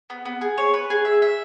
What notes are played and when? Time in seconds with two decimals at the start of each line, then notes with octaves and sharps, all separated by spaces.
0.10 B3
0.25 B3
0.41 G#4
0.58 C#5
0.74 B4
0.90 G#4
1.05 E5
1.22 E5